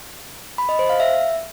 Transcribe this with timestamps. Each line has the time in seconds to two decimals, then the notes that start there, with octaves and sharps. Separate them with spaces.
0.58 B5
0.69 D#5
0.79 C5
0.89 F5
1.00 E5